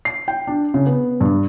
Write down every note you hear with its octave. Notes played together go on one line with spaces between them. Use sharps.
C7
G5
D4
C#3
B3
G2